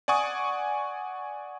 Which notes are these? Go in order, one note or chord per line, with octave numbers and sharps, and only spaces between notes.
D5 F#5 G#5 C#6 D#6